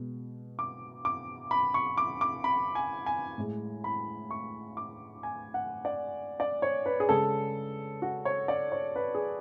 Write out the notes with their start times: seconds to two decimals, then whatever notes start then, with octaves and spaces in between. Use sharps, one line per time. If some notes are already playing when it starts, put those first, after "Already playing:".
Already playing: B2 G#3
0.59 D6
1.05 D6
1.51 B5
1.74 C#6
1.98 D6
2.21 D6
2.44 B5
2.75 G#5
3.06 G#5
3.38 A2 G#3
3.84 B5
4.31 C#6
4.77 D6
5.23 G#5
5.54 F#5
5.85 D5
6.40 D5
6.62 C#5
6.86 B4
7.00 G#4
7.09 C#3 G#3 A4
8.02 F#4
8.25 C#5
8.48 D5
8.72 C#5
8.96 B4
9.15 G#4